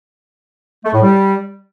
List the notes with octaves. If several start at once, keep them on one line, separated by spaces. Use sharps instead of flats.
A3
A2
G3